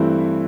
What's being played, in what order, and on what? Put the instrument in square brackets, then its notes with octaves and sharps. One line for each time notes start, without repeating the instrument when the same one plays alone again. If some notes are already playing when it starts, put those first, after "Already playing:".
Already playing: [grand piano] G2 E3 A3 C4 E4